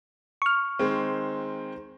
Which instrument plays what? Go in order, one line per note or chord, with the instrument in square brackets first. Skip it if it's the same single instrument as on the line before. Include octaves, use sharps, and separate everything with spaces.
[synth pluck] C#6 F6
[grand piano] D#3 G#3 C4